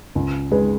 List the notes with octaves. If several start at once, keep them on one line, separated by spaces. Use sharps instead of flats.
C#2
G#3 B4